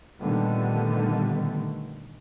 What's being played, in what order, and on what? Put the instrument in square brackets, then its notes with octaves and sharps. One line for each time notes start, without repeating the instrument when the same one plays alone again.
[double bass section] A#2 D3 D#3 G3 A3 B3